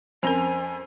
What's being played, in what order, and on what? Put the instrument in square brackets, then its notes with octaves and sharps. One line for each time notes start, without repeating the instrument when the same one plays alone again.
[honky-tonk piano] F2 F7 [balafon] C4 C#4 A#4 [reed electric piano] C5 [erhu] G#5